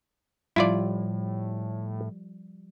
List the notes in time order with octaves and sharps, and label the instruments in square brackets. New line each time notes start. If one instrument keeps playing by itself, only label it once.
[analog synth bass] A2 [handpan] F3 G3 [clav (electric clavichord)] E4 F4 D5